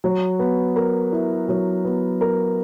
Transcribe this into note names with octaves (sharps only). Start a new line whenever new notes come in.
F#3
B3
A#4
E4
F#3
B3
A#4